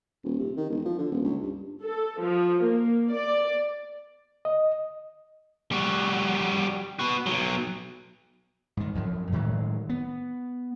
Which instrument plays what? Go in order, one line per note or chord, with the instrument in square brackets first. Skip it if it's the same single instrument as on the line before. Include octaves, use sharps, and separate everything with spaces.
[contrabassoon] D#1
C3
D#3
E1
F3
D3
D#1
C#2
G2
[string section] A4
F3
A#3
D5
[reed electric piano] D#5
[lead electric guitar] G3 F#4
B3 F#4
B2 F#3
[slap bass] G#2 D#3
F#2 F3 F#3
A2 D#3 F#3 G#3
B3